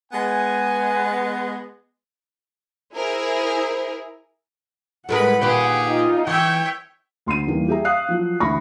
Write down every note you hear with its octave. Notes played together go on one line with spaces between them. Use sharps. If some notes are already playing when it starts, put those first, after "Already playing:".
G#3 B3 G#5
E4 G#4 A#4 C5
A2 G#3 A#4 B4 F#5 B5
A#2 D#3 G4 G#4 B4
D#4 F4
E3 C#5 E5 G5
D2 C6 C7 D#7
E2 D#3 E3 G3 A#3
G4 G#4 E5 A#5
F5 D#6 F#6 C7
F3 F#3
D2 E3 E5 B5 C#6 A#6